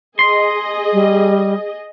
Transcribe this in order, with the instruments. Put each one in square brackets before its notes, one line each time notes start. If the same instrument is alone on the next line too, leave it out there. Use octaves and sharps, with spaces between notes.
[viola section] G#4 D#5 [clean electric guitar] C6
[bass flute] G3